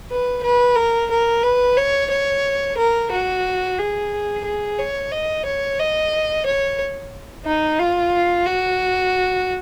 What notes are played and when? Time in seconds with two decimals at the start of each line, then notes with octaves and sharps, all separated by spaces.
0.10 B4
0.43 B4
0.76 A#4
1.11 A#4
1.43 B4
1.77 C#5
2.10 C#5
2.77 A#4
3.11 F#4
3.78 G#4
4.44 G#4
4.79 C#5
5.12 D#5
5.45 C#5
5.79 D#5
6.46 C#5
7.45 D#4
7.79 F4
8.46 F#4